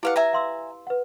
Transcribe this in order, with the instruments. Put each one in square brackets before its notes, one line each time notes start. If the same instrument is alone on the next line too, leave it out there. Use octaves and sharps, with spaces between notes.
[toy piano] E4 G4 B4 [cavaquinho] D5 F5 F#5
[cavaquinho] E5 G#5 A#5
[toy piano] F5 C6 E6
B4 F#5